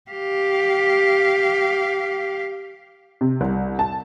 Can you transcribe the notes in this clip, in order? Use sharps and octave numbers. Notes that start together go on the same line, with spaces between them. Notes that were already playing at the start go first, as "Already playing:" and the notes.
G4 F5
C3
C2
A5